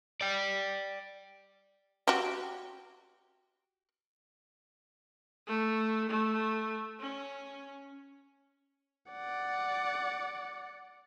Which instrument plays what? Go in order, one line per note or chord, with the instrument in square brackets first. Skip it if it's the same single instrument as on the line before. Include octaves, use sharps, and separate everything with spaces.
[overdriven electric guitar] D5 G5
[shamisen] F#4 G4
[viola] A3
A3
C#4
[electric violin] D5 F#5